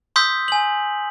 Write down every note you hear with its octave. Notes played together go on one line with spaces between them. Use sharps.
C6 D#6 E6 G6 B6
G#5 F#7